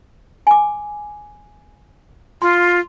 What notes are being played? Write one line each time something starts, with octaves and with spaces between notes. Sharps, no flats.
G#5 D6
F4 C6